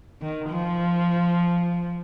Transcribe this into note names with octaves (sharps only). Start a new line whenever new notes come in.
D#3
F3